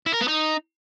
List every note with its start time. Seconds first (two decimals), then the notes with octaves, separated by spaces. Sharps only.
0.06 E4
0.13 A#4
0.21 B3
0.28 D#4